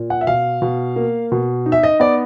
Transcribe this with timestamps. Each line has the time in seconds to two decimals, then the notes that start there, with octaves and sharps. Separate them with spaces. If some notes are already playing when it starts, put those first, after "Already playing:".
Already playing: A#2
0.10 F#5
0.21 E5
0.27 B2 F5
0.62 B2
0.96 A#3
1.32 B2
1.66 D#4
1.72 E5
1.83 D#5
2.00 B3 D5